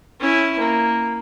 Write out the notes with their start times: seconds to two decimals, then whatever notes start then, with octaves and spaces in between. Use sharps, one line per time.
0.20 C#4 E4
0.59 A#3